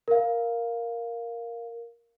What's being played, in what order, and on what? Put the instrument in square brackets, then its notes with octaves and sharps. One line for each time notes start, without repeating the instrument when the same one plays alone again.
[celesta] A#4 F5